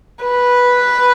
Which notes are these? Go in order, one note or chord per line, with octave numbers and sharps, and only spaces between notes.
B4